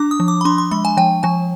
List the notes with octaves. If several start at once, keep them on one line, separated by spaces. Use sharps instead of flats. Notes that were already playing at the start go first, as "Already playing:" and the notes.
Already playing: D4 D6
D#6
F3
D6
B5
D4 C6
C6
G#3 B5
G#5
F3 G5
F3 G#5